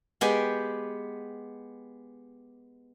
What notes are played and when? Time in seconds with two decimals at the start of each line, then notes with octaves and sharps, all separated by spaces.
0.21 G#3 B3 G4 G5 G#5